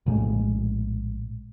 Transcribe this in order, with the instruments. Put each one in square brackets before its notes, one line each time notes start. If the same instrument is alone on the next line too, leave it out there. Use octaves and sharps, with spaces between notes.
[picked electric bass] A#1 A2 G#3